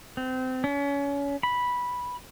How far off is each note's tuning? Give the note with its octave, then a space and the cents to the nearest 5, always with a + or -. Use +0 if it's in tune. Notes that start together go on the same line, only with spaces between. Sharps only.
C4 -25
C#4 +30
B5 -10